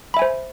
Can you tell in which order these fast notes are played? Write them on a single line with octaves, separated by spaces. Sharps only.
B5 E5 G#5 C5